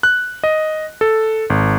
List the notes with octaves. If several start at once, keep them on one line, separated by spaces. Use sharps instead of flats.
F#6
D#5
A4
G#1